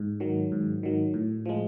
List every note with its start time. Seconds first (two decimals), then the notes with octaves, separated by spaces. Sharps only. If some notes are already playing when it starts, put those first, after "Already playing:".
Already playing: G#2
0.20 D#3 F#3
0.52 G#2
0.83 D#3 F#3
1.14 A2
1.46 F3 G#3